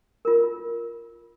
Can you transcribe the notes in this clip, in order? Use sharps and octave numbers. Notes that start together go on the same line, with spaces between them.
F4 A#4